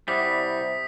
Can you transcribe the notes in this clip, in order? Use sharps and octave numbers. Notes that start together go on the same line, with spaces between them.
C3 G3 E4 D5 F#5 D#6 B6